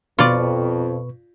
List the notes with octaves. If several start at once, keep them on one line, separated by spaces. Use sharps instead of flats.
F2 B2 F4 B4 D5 C#6